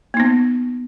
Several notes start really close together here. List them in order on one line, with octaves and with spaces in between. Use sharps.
A#3 D#4 B3